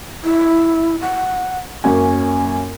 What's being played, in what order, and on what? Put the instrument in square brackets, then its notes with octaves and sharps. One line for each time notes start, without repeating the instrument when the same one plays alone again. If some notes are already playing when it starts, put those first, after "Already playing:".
[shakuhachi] E4
F#5
[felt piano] F#2 A#3 G#5 [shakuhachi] C#4